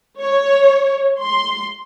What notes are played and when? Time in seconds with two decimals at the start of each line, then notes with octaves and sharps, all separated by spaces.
0.19 C#5
1.19 C6